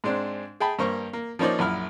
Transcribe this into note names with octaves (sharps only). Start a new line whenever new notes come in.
G#2 G#3 C4 D4
G#4 G5 A5 B5
G2 A#3 C5 C#6
A#3
F3 A#3 C#4 D#4 C5 D5
A#1 F#2 E4 F6